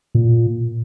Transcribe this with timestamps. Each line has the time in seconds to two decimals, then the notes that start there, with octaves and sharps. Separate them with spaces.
0.15 A#2